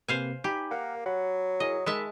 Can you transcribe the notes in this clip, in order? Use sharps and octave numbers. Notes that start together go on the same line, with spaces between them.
C3 A#3 B4 C5 F5 G#5
D#4 G4 G#5 B5
A#3 A#4 F#5 A#5
F#3 F#5 B5
E4 G#4 A#4 D#5
D#3 G#3 E5 A5 B5 E6 B6